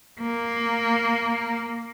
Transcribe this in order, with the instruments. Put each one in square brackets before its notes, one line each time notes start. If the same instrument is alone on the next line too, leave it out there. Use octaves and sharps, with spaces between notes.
[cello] A#3